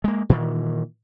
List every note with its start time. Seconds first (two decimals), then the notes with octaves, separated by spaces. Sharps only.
0.04 G#3 A#3
0.29 A#2 D#3 E3